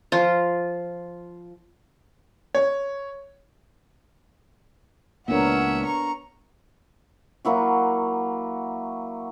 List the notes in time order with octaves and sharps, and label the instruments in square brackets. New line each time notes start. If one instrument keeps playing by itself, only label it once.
[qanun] F3 F4
[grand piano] C#5
[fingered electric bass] C#2 A#2 [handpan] B3 D4 A#4 [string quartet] C#5 E5 F#5
[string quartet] A#5 C#6
[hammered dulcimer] F#3 A#3 E4 F#4